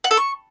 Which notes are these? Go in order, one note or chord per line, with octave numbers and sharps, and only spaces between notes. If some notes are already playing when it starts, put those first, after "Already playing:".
F#5
A4
C#6